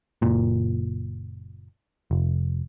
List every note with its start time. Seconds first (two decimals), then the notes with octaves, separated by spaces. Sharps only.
0.22 F#1 A#2
2.11 F1